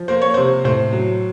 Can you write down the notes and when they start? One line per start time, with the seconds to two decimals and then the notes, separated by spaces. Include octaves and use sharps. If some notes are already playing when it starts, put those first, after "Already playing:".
Already playing: F3
0.08 A#3 C5
0.22 C#5
0.34 C3 C5
0.64 A2 C5
0.93 F#3